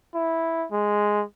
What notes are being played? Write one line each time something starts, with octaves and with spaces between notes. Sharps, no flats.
E4
G#3